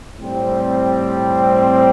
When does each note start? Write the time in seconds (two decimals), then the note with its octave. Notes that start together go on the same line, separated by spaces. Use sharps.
0.18 A2 G3 C4